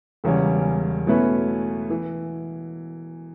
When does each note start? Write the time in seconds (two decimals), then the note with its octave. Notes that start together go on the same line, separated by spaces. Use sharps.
0.24 E1 E2 C#3 G3 C#4
1.07 B2 A3 C#4 E4 B4
1.90 E3